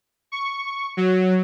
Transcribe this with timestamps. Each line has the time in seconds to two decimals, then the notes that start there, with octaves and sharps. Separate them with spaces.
0.32 C#6
0.97 F#3